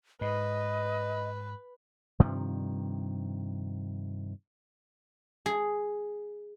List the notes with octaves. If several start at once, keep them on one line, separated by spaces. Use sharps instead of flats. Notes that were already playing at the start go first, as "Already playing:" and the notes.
G#2 B4 D#5
G2 C3 D#3 F3
G#4